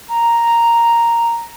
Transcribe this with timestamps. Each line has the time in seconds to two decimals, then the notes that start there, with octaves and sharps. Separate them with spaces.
0.09 A#5